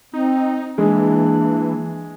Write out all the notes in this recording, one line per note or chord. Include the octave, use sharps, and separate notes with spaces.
C4 D#4
E3 G#3 A#3 D4